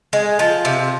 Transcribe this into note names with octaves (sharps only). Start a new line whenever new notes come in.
G#3
F3
C3